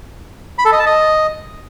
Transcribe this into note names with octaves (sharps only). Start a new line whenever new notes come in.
B5
A4
D#5
A5
D#5